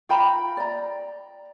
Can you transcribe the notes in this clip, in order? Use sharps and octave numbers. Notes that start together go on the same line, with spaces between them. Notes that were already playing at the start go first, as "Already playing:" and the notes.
F4 G5 A#5 B5
D5 A#5